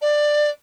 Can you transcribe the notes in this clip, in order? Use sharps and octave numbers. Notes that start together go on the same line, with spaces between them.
D5